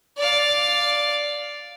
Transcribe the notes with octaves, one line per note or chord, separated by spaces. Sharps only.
D5 F5